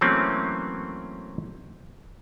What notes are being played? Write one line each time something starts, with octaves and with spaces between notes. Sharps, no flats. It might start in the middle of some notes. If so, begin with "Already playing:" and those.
E3 F#3 A3 A#3 C4 C#4